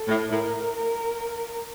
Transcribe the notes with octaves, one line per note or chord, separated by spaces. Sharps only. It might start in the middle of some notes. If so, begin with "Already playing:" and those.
Already playing: A4
A2
A2 A#4
A#4